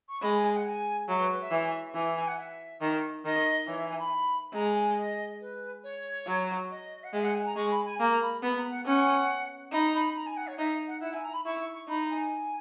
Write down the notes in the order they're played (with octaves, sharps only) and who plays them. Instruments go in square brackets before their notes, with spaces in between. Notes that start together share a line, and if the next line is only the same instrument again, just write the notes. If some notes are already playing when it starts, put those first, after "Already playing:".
[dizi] C#6
[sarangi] G#3 [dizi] B5
[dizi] G#5
F#5
G#5
[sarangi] F#3 [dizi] E5
[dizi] B4
B4
E5
[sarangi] E3
[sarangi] E3 [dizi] G#5
[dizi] G#5
F#5
E5
[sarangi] D#3
[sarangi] D#3 [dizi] D#5
[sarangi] E3 [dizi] C#5
[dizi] E5
G#5
B5
[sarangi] G#3 [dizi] A#5
[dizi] G#5
D#5
B4
C#5
[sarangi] F#3
[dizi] D#5
F#5
[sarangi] G#3 [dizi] E5
[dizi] F#5
G#5
A#5
[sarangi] G#3 [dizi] C#6
[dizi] B5
G#5
[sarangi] A#3 [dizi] A#5
[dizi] B5
[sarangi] B3 [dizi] B5
[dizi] A#5
F#5
[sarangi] C#4 [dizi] F#5
[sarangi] D#4 [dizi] B5
[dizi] B5
A#5
G#5
F#5
C#5
[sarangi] D#4 [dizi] E5
[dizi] F#5
[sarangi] E4 [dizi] F#5
[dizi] G#5
A#5
B5
[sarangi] E4 [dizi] C#6
[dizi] C#6
C#6
[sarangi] D#4 [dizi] B5
[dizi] G#5